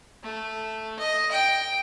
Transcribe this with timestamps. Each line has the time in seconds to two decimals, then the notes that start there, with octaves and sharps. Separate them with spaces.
0.23 A3
0.99 D#5
1.32 G5